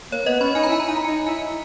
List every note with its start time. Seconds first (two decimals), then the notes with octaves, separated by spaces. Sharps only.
0.12 A#3 C#5
0.26 B3 D#5
0.40 C#4 B5
0.55 D#4 G#5
0.63 A#5
0.69 E4 G#5
0.80 A#5
0.89 D#4 G#5
0.96 A#5
1.05 D#4 G#5
1.27 E4 G#5